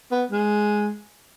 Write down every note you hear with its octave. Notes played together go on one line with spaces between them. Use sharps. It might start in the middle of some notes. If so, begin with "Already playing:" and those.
B3
G#3